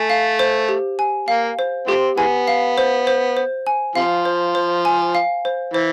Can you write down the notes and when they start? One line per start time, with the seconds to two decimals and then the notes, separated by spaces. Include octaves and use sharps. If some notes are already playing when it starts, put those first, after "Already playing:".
Already playing: A3 G#5
0.10 F5
0.39 C5
0.69 G4
0.99 G#5
1.28 A#3 F5
1.59 C5
1.87 F3 A3 C4 G4
2.17 E3 G#3 B3 G#5
2.48 F5
2.78 C5
3.07 C5
3.37 C5
3.67 G#5
3.95 C3 F3 F5
4.25 C5
4.55 C5
4.85 G#5
5.15 F5
5.45 C5
5.74 E3 C5